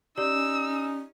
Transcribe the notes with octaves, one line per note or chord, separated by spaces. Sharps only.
C#4 D#4 G4 D5 E6